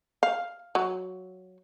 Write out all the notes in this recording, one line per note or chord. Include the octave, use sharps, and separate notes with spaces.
F5
F#3